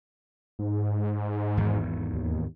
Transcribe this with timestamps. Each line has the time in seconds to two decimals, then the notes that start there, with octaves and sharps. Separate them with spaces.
0.59 G#2
1.57 G#1 E2 D#3
2.14 D#2